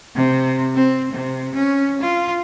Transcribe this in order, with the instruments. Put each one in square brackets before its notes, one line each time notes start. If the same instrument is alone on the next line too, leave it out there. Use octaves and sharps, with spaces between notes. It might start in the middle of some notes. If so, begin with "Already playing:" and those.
[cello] C3
C4
C3
C#4
F4